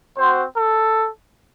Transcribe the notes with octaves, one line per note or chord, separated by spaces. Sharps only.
C4 F#4 C5
A4